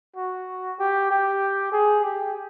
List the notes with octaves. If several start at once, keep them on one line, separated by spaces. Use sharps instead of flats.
F#4
G4
G4
G#4
G4